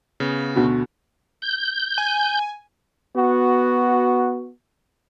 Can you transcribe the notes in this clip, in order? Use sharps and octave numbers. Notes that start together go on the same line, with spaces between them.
C#3 B3
D2 B2 F#4
G6
G#5
B3 F#4